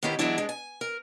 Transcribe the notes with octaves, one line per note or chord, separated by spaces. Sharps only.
A2 D#3 B3 C#4 E4 G4
E3 F#3 G#3 B3 D4 E4
G#3 D4
G#5
A#4